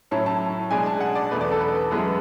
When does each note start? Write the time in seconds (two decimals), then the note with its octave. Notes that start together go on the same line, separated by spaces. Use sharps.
0.11 A2 F#3 C#4 E4 A5
0.26 A5
0.71 B2 G#3 D4 G#5
0.86 A5
1.00 F#5
1.15 D5
1.31 E2 B2 A3 B4
1.41 D5
1.52 A4
1.61 B4
1.91 F#2 E3 G#3 B3 E4